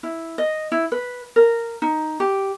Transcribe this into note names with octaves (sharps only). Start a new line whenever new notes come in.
E4
D#5
E4
B4
A#4
D#4
G4